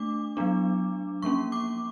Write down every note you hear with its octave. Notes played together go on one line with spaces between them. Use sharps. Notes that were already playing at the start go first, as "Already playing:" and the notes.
Already playing: A3 D4 D6
F#3 B3 D4
F3 A#3 C#4 C#6
D6